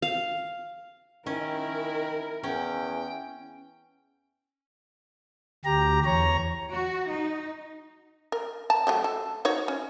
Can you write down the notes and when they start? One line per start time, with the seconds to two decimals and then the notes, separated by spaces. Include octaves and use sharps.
0.02 F5
1.26 D#3 C#4 E4 A#4
2.43 E2 C#4 G5
5.65 D2 G4 A#5
6.05 E2 C#5 A#5
6.72 F#4
7.09 D#4
8.32 A#4
8.70 A5 A#5
8.87 F#3 A3 G4
9.04 A4
9.45 D#4 F#4 C#5
9.68 C#4